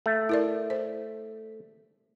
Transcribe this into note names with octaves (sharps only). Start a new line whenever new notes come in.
A3
E4 A#4 D5
C5